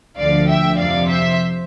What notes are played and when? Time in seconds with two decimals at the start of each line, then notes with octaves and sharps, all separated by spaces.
0.18 D2 D3 F3 D5 F5
0.49 E5 G5
0.78 F2 C3 F3 D5 F5
1.09 C5 E5